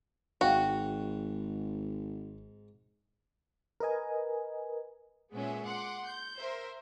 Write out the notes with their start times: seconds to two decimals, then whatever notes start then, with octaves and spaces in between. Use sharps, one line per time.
0.41 G#1 G#2 F#4 F5 G5
3.80 A#4 B4 D#5 G#5
5.32 A#2 G#3 B3 C#4 E5
5.65 F#5 C6 D6
6.06 G6
6.40 A#4 C5 E5